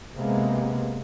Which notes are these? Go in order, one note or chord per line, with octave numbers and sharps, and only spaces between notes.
C3 G#3 A#3 B3